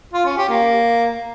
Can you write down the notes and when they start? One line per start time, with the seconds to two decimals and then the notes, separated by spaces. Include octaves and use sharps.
0.13 F4
0.25 C#4
0.37 G4
0.49 A#3